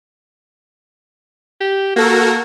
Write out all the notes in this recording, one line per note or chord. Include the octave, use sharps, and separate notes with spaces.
G4
A#3 F#4 A4 A#4